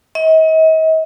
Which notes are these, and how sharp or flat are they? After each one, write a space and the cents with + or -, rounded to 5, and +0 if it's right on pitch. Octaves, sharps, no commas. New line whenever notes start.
D#5 +40